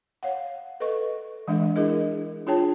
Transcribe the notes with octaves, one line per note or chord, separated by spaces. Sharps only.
C#5 F5 F#5
A4 B4 D#5 C#6
E3 G#3 D4 E5
D4 E4 G#4 A#4 D#5
D4 F4 G#4 C#5 G5 A5